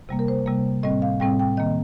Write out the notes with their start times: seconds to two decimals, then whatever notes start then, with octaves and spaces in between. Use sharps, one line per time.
0.09 C3 G3 A#3
0.19 A#4
0.28 C5
0.46 C3 G3 A#3
0.83 A2 G3 C4 D#5
1.02 F5
1.20 A2 G3 C4 G5
1.39 G5
1.57 D#3 A#3 D#5